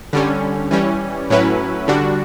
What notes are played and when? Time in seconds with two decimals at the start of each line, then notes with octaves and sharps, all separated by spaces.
0.13 D3 G3 C#4
0.71 E3 G3 C#4
1.30 A2 F#3 C#4 E4 B4
1.88 D3 G3 D4 F#4